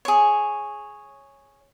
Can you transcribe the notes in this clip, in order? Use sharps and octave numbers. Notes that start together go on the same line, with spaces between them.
G#4 C#5